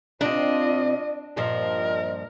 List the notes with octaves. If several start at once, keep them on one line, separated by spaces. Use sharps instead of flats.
C3 C4 D4 F4 D5 D#5
G2 A#2 F3 A#4 D#5